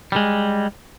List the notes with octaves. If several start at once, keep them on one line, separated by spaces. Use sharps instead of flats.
G3 G#3